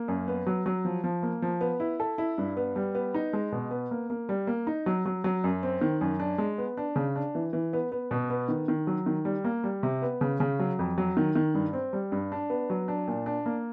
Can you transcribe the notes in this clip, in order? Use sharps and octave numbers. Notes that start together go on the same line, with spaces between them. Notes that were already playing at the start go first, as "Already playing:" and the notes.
Already playing: A#3
F#2
B3
F#3
F#3
F3
F3
A#3
F3
B3
E4
A4
E4
G2
B3
G3
B3
D#4
G#3
B2
B3
A#3
A#3
G3
A#3
D#4
F#3
F#3
F#3
F#2
C4
D#3
F#2
D4
G#3
B3
D4
C#3
D4
E3
E3
B3
B3
B2
B3
D#3
D#3
F#3
D#3
G3
A#3
G3
C3
B3
C#3
C#3
F#3
F2
F#3
D#3
D#3
G2
C4
G3
G2
D4
B3
F#3
D4
A#2
D4
A#3